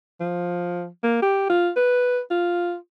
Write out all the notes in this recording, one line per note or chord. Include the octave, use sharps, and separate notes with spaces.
F3
A#3
G4
F4
B4
F4